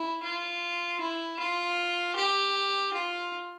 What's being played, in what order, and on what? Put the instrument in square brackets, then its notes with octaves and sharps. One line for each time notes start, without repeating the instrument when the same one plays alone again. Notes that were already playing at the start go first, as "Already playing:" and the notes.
Already playing: [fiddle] E4
F4
E4
F4
G4
F4